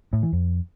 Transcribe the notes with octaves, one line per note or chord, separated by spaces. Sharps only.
A2
E3
F2